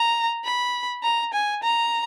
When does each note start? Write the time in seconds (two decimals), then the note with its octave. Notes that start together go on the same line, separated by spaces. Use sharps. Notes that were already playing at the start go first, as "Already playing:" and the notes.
Already playing: A#5
0.44 B5
1.03 A#5
1.33 G#5
1.63 A#5